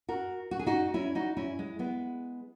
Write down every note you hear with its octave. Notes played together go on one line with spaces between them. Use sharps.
F#4 A#4
F#4
G#4
D#4 F#4
C#4 E4
D#4 F#4
C#4 E4
G#3
G#3 B3